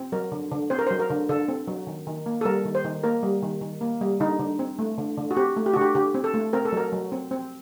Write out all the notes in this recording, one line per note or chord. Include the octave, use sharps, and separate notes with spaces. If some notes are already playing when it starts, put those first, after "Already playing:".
Already playing: C4
F#3 A#4
D3
D3
C4 C5
A#4
F#3 C5
A#4
D3
D3 A4
C4
F#3
D#3
D#3
A#3
A4
G3 A#4
D#3
C5
D#3
A#3 A#4
G3
D#3
D#3
A#3
G3
D3 D#4
D3
C4
A3
D3
D3
F#4
C4 G4
A3
G4
D3 F#4
G4
D3 G4
C4
A4
A3
C4 A#4
A4
F#3 A#4
F#3
C4
C4